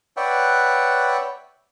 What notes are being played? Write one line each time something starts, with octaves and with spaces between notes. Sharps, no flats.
B4 C#5 D5 E5 F#5 G5